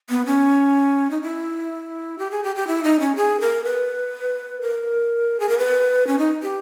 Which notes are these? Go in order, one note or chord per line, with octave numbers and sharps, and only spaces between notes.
B3
C#4
D#4
E4
G4
G#4
G4
G4
E4
D#4
C#4
G#4
A#4
B4
A#4
G#4
A#4
B4
C#4
D#4
G4